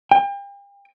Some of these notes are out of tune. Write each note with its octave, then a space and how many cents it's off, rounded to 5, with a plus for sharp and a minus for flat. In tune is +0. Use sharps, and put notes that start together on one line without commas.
G5 +40